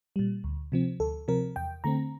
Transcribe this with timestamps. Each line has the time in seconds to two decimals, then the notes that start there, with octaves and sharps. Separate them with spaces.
0.16 A#2 G3
0.44 D2
0.72 C3 F3 C4
1.00 D2 A4
1.28 C3 F3 C4 A#4
1.56 E2 G5
1.84 D3 A3 C4 A#5